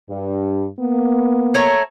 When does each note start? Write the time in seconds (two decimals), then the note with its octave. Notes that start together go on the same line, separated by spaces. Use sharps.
0.10 G2
0.80 A#3 B3
1.54 A3 C#5 A#5